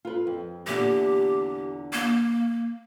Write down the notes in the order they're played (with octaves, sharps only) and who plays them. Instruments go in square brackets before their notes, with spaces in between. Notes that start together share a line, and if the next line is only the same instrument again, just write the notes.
[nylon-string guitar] F4 A4 B4
F2
[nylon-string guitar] E2 A#2 D3 [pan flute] G4
[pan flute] A#3